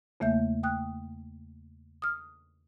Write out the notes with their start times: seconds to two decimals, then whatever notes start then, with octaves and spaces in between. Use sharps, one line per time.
0.20 E2 C#3 A3 A#3 E5 G6
0.63 G5 D#6 F#6
2.02 D#6 F6